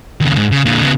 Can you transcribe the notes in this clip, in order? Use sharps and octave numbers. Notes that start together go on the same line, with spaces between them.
D#2 C#3
G#2
C#3
A#2 D3
C#3 B3